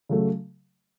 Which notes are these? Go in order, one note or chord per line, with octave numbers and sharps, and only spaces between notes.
C#3 F#3 A3